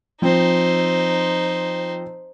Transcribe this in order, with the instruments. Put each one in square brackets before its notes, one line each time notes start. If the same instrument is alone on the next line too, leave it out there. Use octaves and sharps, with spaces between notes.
[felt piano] F3 C4 [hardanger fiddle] D#4 C5